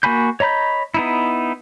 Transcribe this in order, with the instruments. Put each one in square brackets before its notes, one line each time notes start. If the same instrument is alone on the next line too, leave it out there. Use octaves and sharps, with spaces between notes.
[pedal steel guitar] A#3 F#4 G#5 B5 G6
C#5 D#5 A#5 B5 G6
B3 D#4 E4